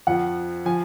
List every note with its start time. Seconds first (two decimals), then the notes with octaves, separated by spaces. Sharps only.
0.07 F2 F3 F#5
0.66 F3 G#5